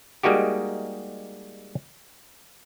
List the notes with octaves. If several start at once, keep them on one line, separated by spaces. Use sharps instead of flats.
G3 G#3 A#3 D#4 F#4 G4